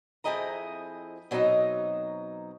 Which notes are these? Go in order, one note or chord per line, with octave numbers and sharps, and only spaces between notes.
F2 C4 E4 G#4 D#5 A#5
B2 F#3 C4 D#4 D#5 A#5